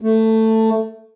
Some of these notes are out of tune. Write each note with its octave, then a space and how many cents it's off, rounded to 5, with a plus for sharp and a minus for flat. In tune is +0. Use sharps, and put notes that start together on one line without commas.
A3 +15